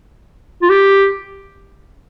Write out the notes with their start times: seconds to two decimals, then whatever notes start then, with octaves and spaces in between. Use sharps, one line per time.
0.62 F4
0.70 G4